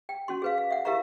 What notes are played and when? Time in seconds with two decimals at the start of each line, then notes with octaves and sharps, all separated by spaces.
0.09 G5
0.28 C#4 F#4 C6
0.42 G#4 B4 F5
0.58 F5
0.71 E5 F#5
0.85 E4 G4 A#4 E5 F5 A#5